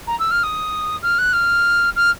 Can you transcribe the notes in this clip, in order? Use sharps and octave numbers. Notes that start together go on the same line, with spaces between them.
A#5
E6
F6
D#6
F6
F#6
F6
F6